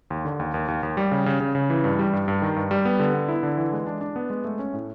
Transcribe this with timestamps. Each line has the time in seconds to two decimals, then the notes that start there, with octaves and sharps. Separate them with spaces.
0.10 D#2
0.25 D3
0.39 D#2
0.54 D#2
0.68 D#2
0.83 D#2
0.97 G3
1.12 C#3
1.26 C#3
1.40 C#3
1.55 C#3
1.70 E3
1.84 G2
1.99 G3
2.13 G2
2.28 G2
2.42 D#3
2.56 G2
2.71 G3
2.85 B3
3.00 D3
3.14 B3
3.28 E4
3.43 D3
3.58 E3
3.73 G#3
3.87 D4
4.01 D4
4.16 B3
4.30 G#3
4.45 A3
4.59 C#4
4.74 A2